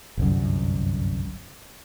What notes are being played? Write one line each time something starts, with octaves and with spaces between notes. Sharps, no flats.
G1 C2 F#2